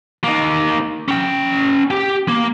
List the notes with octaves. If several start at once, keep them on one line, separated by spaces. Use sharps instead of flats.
A#3 D#4
C#4 G5
G4 G5
A#3